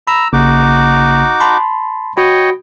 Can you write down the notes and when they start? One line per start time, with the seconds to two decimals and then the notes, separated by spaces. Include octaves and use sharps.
0.07 A#5 B5 E6
0.33 A1 C#3 A#3 D#4 F#4 D6
1.40 A5 B5 C6
2.17 F#4 C#5 D#5 G5 B5